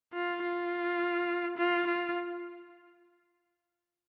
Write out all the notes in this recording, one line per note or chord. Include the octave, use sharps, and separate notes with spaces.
F4
F4
F4
F4